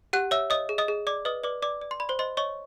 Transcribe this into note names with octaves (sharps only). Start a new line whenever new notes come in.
G4 F#5 F#6
C#5 E5 E6
C#5 D#5 D#6
G#4
D#5 D#6
G#4
D5 D6
B4 D#5 D#6
B4 D5 D6
D5 D6
D5
C6
D5 B5
C5 C6
C5 D#5 C6
C#5 D#5 C#6